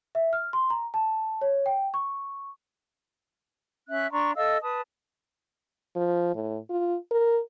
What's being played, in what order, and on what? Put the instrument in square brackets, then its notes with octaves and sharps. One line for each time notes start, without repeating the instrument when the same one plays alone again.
[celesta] E5
F6
C6
A#5
A5
C#5
G5
C#6
[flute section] C#4 E5 F#6
D4 A#5 C6 C#6
A4 D#5 F5 E6
B4 A5 D#6
[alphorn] F3
A2
F4
A#4